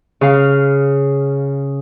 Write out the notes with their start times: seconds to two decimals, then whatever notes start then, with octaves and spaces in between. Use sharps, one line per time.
0.21 C#3 F5